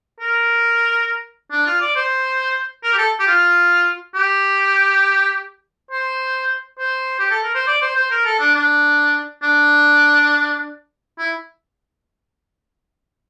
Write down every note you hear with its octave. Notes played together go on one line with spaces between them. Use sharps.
A#4
D4
F4
D5
C5
A#4
G4
A4
G4
F4
G4
C5
C5
G4
A4
A#4
C5
D5
C5
C5
A#4
A4
D4
D4
D4
E4